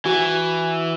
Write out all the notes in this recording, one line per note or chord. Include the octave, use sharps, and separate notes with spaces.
E3 F#4